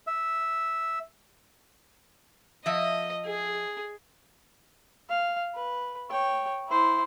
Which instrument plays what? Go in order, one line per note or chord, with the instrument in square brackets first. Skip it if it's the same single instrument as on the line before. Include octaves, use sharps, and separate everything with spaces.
[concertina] E5
[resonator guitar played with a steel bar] F3 E5 [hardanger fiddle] D#5
[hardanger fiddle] G#4
[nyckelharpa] F5
B4
C#5 G5
E4 C5